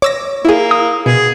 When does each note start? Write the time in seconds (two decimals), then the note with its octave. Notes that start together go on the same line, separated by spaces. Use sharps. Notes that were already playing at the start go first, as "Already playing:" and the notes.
0.02 C#5 D6 E6 A#6
0.45 A#3 E4 G#4
0.71 D#6
1.06 B2 G#4